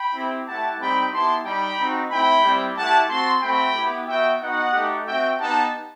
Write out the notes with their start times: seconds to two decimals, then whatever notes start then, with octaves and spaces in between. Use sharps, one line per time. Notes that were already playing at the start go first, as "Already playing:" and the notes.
Already playing: G5 B5
0.14 C4 E4 G4
0.47 A3 E4 G4 F#5 A5
0.79 G3 C4 D#4 G4 G5 B5
1.12 B3 E4 G4 A5 C6
1.45 G3 D#4 G4 G5 B5
1.78 C4 D#4 F#4
2.10 A3 C4 E4 G5 B5
2.44 G3 C4 E4 G4
2.76 A3 E4 G4 F#5 A5
3.10 C4 F#4 A5 C6
3.42 A3 C4 F#4 G5 B5
3.75 B3 E4 G4
4.07 B3 F#4 E5 G5
4.40 B3 D#4 F#4 D#5 F#5
4.73 A3 D#4 G4
5.06 C4 F#4 E5 G5
5.39 B3 D#4 G4 F#5 A5